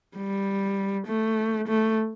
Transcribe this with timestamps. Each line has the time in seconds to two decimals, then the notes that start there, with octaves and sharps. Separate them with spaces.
0.16 G3
1.07 A3
1.68 A3